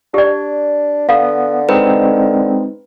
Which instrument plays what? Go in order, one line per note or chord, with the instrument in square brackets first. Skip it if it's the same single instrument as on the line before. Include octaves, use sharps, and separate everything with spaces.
[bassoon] D4 [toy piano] G4 D5
[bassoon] D3 [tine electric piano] B3 [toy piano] F5
[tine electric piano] G#3 C4 D#4 [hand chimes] B4